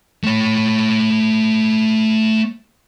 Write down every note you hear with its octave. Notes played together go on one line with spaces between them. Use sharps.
A3 C#5